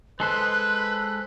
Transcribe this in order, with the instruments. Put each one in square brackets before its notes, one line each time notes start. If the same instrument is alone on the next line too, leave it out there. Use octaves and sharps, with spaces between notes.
[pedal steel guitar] G#3 A4 C5 [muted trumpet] B4 [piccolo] F#6